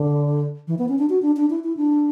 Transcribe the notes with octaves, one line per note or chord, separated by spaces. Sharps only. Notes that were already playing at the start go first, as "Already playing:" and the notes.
Already playing: D3
E3
B3
C#4
D4
F#4
D4
D4
E4
E4
D4